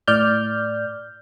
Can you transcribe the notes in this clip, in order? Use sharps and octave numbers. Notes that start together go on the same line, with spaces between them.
A2 D5 F6 G6